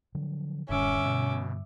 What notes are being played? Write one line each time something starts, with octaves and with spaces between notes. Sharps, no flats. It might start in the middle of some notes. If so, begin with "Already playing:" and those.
D3 F3 F#3
D#1 G2 D3 G3 C#4 E5 D6
B2